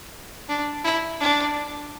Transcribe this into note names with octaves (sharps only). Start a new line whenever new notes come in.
D4
E4
D4